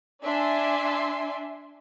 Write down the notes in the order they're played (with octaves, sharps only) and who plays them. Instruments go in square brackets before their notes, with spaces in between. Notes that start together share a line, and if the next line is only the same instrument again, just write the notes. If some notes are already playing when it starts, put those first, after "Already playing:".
[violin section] D4 E5 G#5 C6